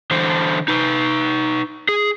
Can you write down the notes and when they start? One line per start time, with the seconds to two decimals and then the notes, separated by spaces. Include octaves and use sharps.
0.11 D3 E3 C5
0.68 D#4 B4
1.89 G#4